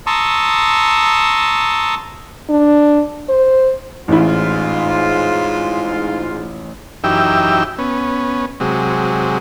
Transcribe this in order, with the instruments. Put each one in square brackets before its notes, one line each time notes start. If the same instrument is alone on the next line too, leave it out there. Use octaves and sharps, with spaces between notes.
[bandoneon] A5 A#5 C6 C#6 D#6 E6
[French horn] D4
C5
[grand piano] A1 E4 [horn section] G#2 F4
[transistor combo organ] F#2 E3 D#4 G4 G5 E6
B3 C#4
C3 F#3 G#3